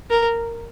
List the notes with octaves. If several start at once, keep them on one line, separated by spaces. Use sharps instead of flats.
A#4